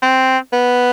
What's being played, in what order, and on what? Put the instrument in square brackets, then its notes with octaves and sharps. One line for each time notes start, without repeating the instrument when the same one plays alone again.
[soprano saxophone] C4
B3